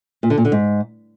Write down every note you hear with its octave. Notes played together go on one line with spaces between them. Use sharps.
A#2
D3
A#2
D3
G#2